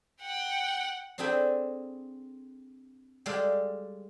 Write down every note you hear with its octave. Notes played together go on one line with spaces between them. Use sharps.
F#5 G5
C4 D4 G#4 A4 G5 B5
G3 G#3 G4 A4 D5 F5